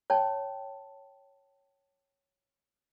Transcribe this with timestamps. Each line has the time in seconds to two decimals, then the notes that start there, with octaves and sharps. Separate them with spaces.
0.10 C#5 G5 A5